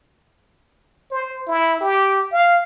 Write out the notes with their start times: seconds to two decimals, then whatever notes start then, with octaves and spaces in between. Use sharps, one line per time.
1.11 C5
1.47 E4
1.81 G4
2.33 F5